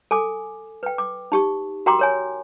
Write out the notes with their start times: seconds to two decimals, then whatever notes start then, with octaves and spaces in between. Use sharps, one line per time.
0.11 A4 G#5 D6
0.83 B4 G5
0.98 D6
1.32 D#4 G4 C#6
1.86 F#4 A#4 G5 A#5 C6 D6
1.99 A#4 C#5 G#5